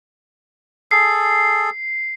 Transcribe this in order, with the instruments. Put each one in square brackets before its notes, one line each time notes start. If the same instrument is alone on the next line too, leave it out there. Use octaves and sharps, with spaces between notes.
[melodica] G#4 A4 [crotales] C7